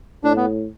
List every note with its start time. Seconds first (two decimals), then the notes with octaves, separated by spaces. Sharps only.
0.24 A2 D4
0.36 B3